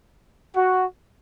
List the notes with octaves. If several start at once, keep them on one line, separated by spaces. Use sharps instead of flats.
F#4